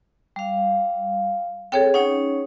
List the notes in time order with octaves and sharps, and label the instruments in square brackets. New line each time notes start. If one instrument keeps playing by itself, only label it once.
[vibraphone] G3 F5
[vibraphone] C4 A4 [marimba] G#4 C#5 G5
[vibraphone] C#4 D#4 C#5 [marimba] F#5